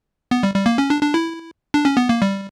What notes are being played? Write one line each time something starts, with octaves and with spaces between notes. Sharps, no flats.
B3
G3
G3
A#3
C#4
D4
D4
E4
D4
C#4
B3
A#3
G3